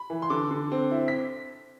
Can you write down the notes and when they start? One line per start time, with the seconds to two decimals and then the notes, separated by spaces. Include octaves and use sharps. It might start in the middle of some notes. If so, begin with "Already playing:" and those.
Already playing: B5
0.10 E3
0.22 C6
0.30 D3 D6
0.51 D3
0.72 C4
0.91 E4
1.08 B6